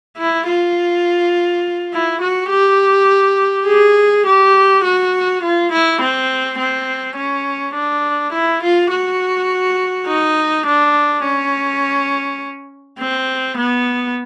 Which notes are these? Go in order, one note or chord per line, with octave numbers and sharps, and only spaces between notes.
E4
F4
E4
F#4
G4
G#4
G4
F#4
F4
E4
C4
C4
C#4
D4
E4
F4
F#4
D#4
D4
C#4
C4
B3